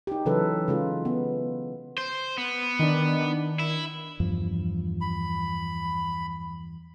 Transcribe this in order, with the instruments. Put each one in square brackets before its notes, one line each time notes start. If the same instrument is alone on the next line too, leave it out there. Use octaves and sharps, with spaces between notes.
[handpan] D#4 G4
C#3 E3 F#3 A4 B4
C#3 G#3 F4
B3
[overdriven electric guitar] C5
B3
[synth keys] D#3 D4
[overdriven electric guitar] E4
[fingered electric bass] E2 G2 F3
[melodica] B5